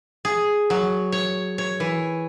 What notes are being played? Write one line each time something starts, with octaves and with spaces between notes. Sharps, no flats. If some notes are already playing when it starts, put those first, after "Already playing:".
G#4
F#3
C#5
C#5
E3